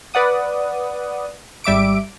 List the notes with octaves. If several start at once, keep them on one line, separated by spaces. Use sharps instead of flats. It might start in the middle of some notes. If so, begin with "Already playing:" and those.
B4 D5 F#5 D#6
G#1 G3 E5 D6 D7